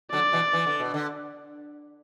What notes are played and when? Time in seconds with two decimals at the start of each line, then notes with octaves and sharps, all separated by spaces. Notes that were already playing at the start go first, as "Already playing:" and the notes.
0.12 D3 F#3 D5
0.33 B2 E3
0.53 E3
0.66 D3
0.80 B2
0.94 D3